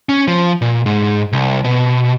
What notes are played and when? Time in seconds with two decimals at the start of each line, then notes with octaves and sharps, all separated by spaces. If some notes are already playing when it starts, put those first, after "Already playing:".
0.09 C#4
0.28 F3
0.62 A#2
0.86 G#2
1.32 C2
1.64 B2